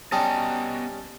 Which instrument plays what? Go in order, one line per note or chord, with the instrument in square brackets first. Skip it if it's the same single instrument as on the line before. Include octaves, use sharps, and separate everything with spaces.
[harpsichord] G3 C#4 G4 [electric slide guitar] B3 D#5 A#5 [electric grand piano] A5 D#6